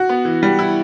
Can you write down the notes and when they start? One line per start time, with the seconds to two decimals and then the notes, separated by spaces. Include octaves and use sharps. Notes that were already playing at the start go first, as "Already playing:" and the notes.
Already playing: F#4
0.09 B3
0.25 E3
0.43 G3
0.59 E4